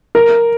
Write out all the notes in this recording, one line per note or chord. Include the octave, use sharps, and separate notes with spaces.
A#4